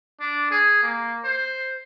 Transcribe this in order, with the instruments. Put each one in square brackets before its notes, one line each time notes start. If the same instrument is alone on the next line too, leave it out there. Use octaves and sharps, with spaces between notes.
[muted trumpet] D4
G#4
A#3
C5